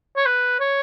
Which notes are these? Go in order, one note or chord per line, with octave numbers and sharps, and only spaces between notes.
C#5
B4
C#5